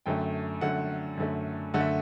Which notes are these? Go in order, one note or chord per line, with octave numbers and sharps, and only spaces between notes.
F#2 D3 A3 G5
F#2 D3 A3 F#5
F#2 D3 A3
F#2 D3 A3 F#5
E5